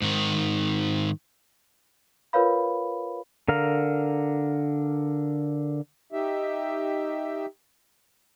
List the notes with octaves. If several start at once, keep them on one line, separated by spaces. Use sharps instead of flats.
G#2 D#3
F4 A#4 B4 C#5 F5 B5
D3 A#4 F5
D#4 G4 E5